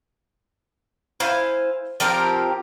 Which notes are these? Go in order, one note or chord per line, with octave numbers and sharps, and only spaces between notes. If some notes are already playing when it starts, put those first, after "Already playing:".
E4 C5 F5 G#5
F3 C4 G4 A#4